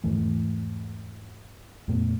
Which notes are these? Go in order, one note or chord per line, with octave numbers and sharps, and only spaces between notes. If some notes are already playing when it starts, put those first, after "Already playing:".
E2 G#2 E3 A3
F2 A#2 A3 B3